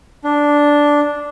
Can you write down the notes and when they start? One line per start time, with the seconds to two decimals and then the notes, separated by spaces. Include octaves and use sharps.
0.24 D4